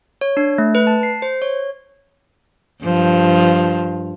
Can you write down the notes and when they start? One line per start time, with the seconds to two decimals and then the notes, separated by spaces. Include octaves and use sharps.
0.21 C#5
0.37 D4
0.58 A3
0.75 B4
0.87 A5
1.03 C7
1.22 C5
1.42 C#5
2.84 G2 F3